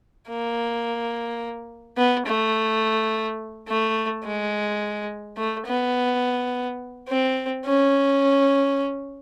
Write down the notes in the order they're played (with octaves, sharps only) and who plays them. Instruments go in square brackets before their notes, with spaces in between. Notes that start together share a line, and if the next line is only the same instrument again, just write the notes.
[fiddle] A#3
B3
A3
A3
G#3
A3
B3
C4
C#4